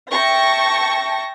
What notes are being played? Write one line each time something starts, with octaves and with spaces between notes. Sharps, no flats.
E5 G5 A5 C#6 A#6